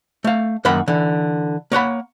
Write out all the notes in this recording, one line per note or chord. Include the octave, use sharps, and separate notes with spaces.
A3 F5
F#2 D#3 A#3 F#5 B5
D3 E3
A#3 C#5 F#5 B5